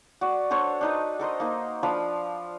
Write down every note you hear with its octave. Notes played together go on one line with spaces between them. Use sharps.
F#4 D5
D4 A4 C5 C#5
D4 D#4 B4
A4 A#4 C5 D#5
A#3 D#4
F3 D4 F5 B5